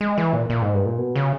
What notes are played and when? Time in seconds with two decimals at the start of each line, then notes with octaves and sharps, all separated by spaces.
0.01 G#3
0.18 E3
0.33 A#2
0.50 A#2
0.62 G#2
0.74 G2
0.86 A#2
0.98 B2
1.16 C#3